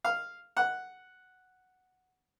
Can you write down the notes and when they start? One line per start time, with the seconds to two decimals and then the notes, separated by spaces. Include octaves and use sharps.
0.04 F5
0.57 F#5